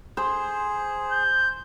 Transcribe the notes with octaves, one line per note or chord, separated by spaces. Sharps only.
G#4 C5
G6